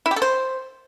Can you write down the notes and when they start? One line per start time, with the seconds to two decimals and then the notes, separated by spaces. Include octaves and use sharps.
0.06 E4
0.11 G4
0.16 A4
0.22 C5